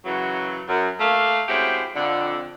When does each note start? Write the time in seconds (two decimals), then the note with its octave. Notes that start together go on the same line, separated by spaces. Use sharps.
0.05 F#2 C#3 E3 F#3
0.69 F#2
1.00 A3 A#3 F5
1.48 G#3 C4 C#4 E4 F#4 G4
1.95 F2 D3